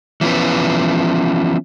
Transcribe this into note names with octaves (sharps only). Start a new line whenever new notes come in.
E3 F3 B3 C#4 B4